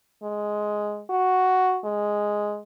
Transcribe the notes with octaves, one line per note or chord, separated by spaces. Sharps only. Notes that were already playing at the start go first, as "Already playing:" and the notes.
G#3
F#4
G#3